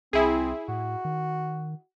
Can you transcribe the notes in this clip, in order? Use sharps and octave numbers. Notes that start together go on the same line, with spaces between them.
C2 C4 E4 G#4
A2 F#4
D#3